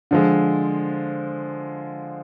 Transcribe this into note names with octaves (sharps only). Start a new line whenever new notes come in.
D3 F3 G#3